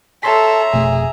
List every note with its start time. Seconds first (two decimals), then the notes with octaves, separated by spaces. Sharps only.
0.23 A4 C#5 E5 A#5 C6 B6
0.73 F1 B2 A3 G#4